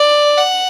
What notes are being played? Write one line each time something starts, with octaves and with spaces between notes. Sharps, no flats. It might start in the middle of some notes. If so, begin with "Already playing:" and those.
Already playing: D5
F#5